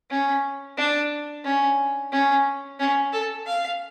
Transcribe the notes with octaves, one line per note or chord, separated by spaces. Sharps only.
C#4
D4
C#4
C#4
C#4
A4
F5